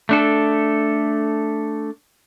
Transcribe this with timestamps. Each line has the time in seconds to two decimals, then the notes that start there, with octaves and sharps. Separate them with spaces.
0.09 A3 D4 A4